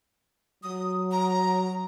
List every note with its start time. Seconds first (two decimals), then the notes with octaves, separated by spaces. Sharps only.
0.63 F#3 D#6
1.12 A#5